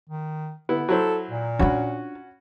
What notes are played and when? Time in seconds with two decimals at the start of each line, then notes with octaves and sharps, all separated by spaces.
0.09 D#3
0.69 D3 B3 E4
0.89 F#3 E4 A4 C5
1.31 A#2
1.59 C#4 D4 F4 F#4 B5